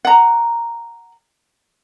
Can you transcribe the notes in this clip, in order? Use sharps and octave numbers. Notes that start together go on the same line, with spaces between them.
F#5 A#5